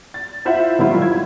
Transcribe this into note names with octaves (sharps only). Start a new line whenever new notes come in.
A6
E4 F4 C5 E5 F#5
G#2 D#3 F#3 G3 E4 F4
G#6